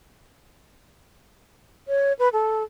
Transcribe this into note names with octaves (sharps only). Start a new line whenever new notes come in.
C#5
B4
A4